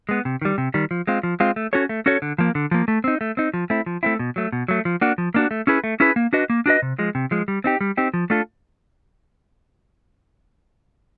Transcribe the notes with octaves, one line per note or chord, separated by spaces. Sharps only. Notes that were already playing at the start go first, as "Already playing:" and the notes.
G#3 B3
C3
D#3 G3
C3
D#3 G3
F3
G#3 C4 F4
F3
G#3 C4 F4
A3
C#4 F#4 A4 C#5
A3
C#4 F#4 A4 C#5
D3
F3 A#3
D3
F3 A#3
A3
C4 D#4
A3
C4 D#4
F3
A3 C4 E4
F3
A3 C4 E4
B2
F#3 A3
B2
F#3 A3
F3
A#3 D4 F#4
F3
A#3 D4 F#4
A3
C#4 E4 G#4 B4
A3
C#4 E4 G#4 B4
A#3
D4 F#4 B4 D#5
A#3
D4 F#4 B4 D#5
C3
F3 G#3
C3
F3 G#3
G3
C4 D#4 G4
G3
C4 D#4 G4
F3
A3 D4 F4 A4